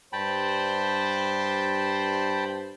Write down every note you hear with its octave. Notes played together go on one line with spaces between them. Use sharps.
G2 C5 G5 A5 B5